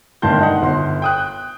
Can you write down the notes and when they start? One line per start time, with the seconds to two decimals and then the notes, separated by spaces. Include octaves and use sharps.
0.22 G1 G2 D#3 A5 C6 G6
0.41 D#4 F#5
0.62 G1 C6
1.02 G5 D#6 F#6